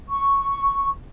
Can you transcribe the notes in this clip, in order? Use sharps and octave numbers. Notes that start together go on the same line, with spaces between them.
C#6